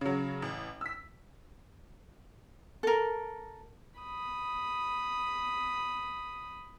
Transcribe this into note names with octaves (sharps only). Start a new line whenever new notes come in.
C#3 F#3
A1
E6 B6
A4 A#4
B5 D#6